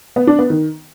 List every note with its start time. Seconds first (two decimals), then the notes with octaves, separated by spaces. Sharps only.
0.16 B3
0.27 D4
0.39 B3
0.50 D#3